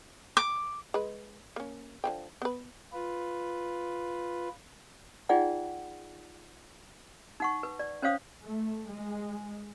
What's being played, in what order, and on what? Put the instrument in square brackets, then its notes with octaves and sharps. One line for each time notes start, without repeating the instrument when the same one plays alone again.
[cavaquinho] D6
[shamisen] G#3 B4
A#3 C#4
D3 F3 G5
B3 B4
[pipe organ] F4 B4
[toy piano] D#4 F4 G#4 D5 F#5 G5
D#4 F#5 C#6
B4
D5
C#4 C5 C#5 F5 D#6
[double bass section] A3
G#3